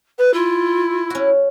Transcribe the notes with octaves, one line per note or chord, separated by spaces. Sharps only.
B4
E4 F4
C#4 F#4